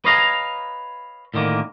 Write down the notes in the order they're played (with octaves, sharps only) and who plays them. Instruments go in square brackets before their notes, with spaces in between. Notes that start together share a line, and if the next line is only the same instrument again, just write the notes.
[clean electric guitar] B4 C#5 D#5 F5 G#5 A#5
A2 D3 D#3 A3 A#3